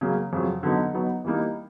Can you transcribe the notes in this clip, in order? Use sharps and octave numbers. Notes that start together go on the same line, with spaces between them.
C#3 F#3 A#3
F2 C#3 F#3
D3 F#3 B3 D#4
F#3 B3 D#4
E3 G3 A#3 D#4